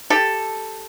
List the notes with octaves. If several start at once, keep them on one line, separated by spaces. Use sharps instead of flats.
G4 A4